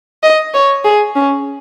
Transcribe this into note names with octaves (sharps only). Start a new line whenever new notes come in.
D#5
C#5
G#4
C#4